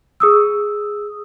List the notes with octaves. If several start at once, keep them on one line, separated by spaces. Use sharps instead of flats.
G#4 D#6 E6